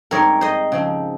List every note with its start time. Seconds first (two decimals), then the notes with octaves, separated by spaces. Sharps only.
0.11 G#2 G3 C4 A#4 C#5
0.41 C5 D#5
0.72 C#3 F3 C4